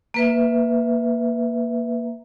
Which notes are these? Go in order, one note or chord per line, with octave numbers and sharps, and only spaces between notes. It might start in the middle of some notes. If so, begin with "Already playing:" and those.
A#3 B4 E5